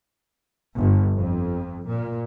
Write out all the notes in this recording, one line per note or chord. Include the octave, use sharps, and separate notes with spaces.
G1
F2
A#2